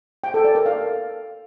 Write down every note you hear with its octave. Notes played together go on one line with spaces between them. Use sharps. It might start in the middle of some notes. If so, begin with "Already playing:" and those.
G5
A4
D5
A#4
F5